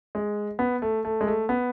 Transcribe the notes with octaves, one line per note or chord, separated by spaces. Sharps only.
G#3
B3
A3
A3
G#3
A3
B3